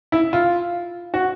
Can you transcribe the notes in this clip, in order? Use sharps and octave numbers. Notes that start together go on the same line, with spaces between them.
E4
F4
F#4